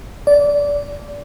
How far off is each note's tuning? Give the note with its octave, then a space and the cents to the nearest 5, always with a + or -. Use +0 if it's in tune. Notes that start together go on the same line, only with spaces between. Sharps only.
D5 -20